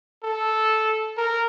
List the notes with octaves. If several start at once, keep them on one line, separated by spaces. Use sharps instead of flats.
A4
A#4